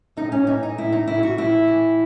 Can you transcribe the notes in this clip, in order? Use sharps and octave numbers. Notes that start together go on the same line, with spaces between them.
A2 D#4
C#4
E3 D#4
D#4
A2 E4
D#4
E3 E4
F#4
A2 E4
E3